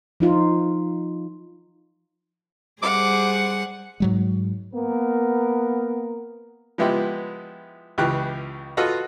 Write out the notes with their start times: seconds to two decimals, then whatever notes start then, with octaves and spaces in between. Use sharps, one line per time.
0.20 F3 D#4 F4
2.82 G3 G#4 C5 F#5 D6
4.00 G#2 F#3 G#3
4.74 A#3 B3 A#4
6.78 F3 G#3 B3 E4 G4
7.98 C#2 C#3 E3 G4 F#6
8.77 F4 F#4 A4 B4 D#5